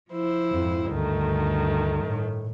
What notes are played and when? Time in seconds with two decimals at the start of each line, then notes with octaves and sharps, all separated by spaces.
0.12 F3 E4 C5
0.52 F2 G#2
0.90 D2 G2 D#3 A3
2.05 A2